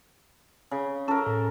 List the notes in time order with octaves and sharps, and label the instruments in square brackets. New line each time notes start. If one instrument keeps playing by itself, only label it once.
[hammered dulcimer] C#3
[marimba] C#4 [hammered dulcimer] A4 A#4
[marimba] A2